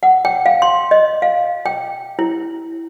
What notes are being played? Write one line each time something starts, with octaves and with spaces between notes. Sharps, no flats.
F#5
G5
F5
C6
D#5
F5
G5
E4